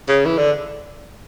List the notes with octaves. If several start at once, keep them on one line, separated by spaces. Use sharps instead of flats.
C#3
E3
D3